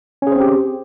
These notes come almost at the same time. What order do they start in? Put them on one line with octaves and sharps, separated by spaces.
C#4 G#4 C5 C4 G4